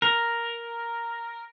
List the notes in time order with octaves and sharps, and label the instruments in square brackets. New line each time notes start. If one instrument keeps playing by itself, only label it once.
[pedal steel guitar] A#4